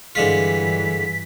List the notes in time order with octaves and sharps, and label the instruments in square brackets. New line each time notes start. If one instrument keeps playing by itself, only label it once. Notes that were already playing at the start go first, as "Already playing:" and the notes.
[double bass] G2 E3 [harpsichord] D3 G#3 F4 [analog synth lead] B6